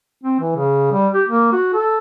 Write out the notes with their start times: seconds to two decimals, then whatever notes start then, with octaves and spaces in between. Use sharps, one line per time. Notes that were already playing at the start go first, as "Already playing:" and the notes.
0.23 C4
0.40 E3
0.56 C#3
0.92 G3
1.14 G4
1.29 A#3
1.53 F#4
1.74 A4